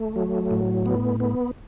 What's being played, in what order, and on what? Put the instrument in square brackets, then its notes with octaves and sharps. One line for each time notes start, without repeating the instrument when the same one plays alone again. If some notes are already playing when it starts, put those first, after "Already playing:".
Already playing: [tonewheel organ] A3
F#3
A2
B3
B3